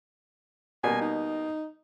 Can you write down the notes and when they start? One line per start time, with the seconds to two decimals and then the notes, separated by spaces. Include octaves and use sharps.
0.84 B2 G3 A#3 G#5
1.01 D#4